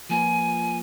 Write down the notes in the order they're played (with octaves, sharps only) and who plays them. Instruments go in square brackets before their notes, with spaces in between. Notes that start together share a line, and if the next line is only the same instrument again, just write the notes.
[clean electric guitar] F3 A#3 F4 B4 [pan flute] G#5